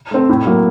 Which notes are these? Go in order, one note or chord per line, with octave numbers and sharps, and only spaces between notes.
A3 C4
A2
F#3 A#3